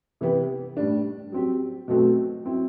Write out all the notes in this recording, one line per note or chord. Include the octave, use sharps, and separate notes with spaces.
C3 E3 B3 E4 G4
A2 G3 D4
F#3 C4 G4
B2 F#3 A3 C4 F#4
F#3 C4 E4